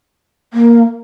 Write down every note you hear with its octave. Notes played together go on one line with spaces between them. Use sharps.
A#3